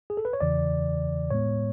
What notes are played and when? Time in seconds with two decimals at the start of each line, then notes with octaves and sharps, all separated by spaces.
0.10 G#4
0.17 A4
0.25 B4
0.33 C#5
0.41 E2 C#3 E3 D5
1.30 A2 G#3 B3 C#5